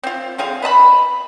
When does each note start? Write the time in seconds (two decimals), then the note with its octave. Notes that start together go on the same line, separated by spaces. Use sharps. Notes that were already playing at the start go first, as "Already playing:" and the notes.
0.03 C4 F4
0.38 D3 C4 G#4 F5
0.62 B4 D#5 A5 B5